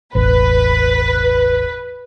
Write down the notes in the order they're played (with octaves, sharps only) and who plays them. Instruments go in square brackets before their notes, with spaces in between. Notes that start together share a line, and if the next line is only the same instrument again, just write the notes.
[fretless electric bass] E1 A1 [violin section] B4